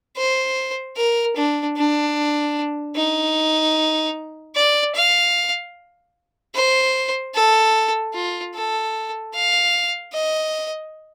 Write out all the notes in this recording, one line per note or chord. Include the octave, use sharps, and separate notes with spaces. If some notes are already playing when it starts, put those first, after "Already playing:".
C5
A#4
D4
D4
D#4
D5
F5
C5
A4
F4
A4
F5
D#5